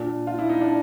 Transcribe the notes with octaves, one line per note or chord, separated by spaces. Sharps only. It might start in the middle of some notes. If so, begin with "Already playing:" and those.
Already playing: A#2 D4
F4
E4
D#4
D4